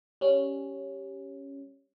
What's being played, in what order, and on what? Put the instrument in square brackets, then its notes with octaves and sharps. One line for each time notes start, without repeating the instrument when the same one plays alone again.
[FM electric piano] G3 C#4